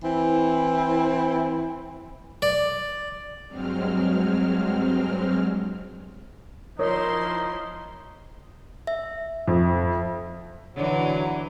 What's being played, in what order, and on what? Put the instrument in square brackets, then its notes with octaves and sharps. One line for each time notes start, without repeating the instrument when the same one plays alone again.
[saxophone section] E3 C4 E4
[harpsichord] D5
[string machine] G2 F#3 G#3 C4 F6
[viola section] F3 E4 C6 [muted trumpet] D#4 [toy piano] A#4 [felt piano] C#5
[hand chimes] E5
[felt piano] F2
[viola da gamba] D3 E3 [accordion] F#3